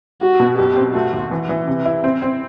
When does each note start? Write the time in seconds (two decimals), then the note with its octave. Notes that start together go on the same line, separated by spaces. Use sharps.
0.21 G3 F#4
0.40 B2
0.58 F#2 G4
0.76 C4
0.94 A3 F#4
1.13 D#2
1.31 E3
1.49 E3
1.68 C3
1.85 E4
2.04 C4
2.22 C4